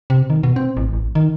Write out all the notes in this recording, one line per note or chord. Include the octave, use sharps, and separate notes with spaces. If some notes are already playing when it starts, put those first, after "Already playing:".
C3
D#3
B2
C4
A1
A1
D#3